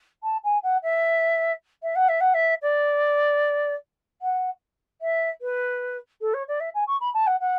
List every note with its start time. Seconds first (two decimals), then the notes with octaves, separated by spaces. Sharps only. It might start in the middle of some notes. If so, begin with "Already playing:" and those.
0.23 A5
0.44 G#5
0.63 F#5
0.83 E5
1.83 E5
1.95 F#5
2.09 E5
2.20 F#5
2.34 E5
2.62 D5
4.22 F#5
5.01 E5
5.41 B4
6.21 A4
6.34 C#5
6.48 D5
6.60 E5
6.74 G#5
6.87 C#6
7.00 B5
7.14 A5
7.27 F#5
7.40 F#5